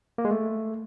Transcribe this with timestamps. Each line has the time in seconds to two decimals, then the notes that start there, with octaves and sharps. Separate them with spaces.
0.18 A#3
0.25 G#3
0.31 A3